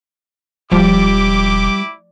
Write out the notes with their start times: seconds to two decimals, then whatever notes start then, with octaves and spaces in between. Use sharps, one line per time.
0.72 E1 F3 G3 E4 G4 D6